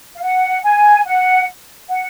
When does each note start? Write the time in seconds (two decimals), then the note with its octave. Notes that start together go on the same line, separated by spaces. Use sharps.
0.16 F5
0.21 F#5
0.63 G#5
1.05 F#5
1.89 F#5